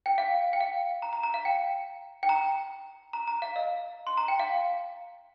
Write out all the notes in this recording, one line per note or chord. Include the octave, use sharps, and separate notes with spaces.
G5
F5
G5
F5
A#5
A#5
A#5
F5
G5
G5
A#5
A#5
A#5
F5
D#5
C6
A#5
G5
F5